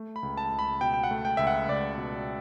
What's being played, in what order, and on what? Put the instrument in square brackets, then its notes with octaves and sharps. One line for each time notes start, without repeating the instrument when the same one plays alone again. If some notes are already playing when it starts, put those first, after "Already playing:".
Already playing: [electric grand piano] A3
B5
C#2
A5
C#2
B5
B2 G5
G5
F#5
A3
G5
C#2 E5
F#5
C#2 D5
B2